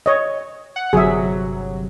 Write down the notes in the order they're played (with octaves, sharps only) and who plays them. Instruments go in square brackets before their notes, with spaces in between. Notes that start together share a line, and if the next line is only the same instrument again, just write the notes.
[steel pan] C#5 D#5
[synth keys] F#5
[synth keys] G1 C3 F#3 [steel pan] G#4 E5